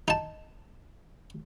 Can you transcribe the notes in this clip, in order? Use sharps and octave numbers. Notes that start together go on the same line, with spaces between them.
D#4 A5